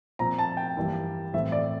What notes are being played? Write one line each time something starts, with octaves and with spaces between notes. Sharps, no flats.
A#2 F3 C4 A#5
A5
G5
G2 E3 G3 A#3 E4
A2 E3 A3 C4 E5
D5